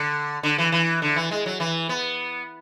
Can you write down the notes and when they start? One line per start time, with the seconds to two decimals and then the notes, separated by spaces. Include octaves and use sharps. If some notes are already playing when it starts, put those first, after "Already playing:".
Already playing: D3
0.43 D3
0.58 E3
0.72 E3
1.02 D3
1.16 E3
1.31 G#3
1.46 F#3
1.60 E3
1.89 B3